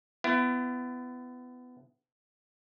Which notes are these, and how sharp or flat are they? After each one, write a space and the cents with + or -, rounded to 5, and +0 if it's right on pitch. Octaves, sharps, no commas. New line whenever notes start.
B3 +20 E4 +35